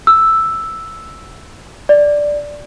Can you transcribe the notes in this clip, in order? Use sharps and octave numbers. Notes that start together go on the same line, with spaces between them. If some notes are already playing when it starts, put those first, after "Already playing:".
E6
D5